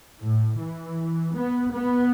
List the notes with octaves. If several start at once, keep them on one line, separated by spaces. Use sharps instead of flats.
A2
E3
B3
B3